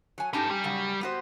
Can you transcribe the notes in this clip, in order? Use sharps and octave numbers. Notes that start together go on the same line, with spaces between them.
F#3 G#5
G3 C#4 D#4 G4 A4
G3
A#2 C#3 F#3
B3 F#4 C5